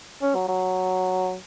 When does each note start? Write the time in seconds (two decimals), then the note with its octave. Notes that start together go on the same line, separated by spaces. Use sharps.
0.22 C#4
0.35 F#3
0.49 F#3